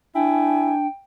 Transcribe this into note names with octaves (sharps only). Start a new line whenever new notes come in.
D4 E4 G5 G#5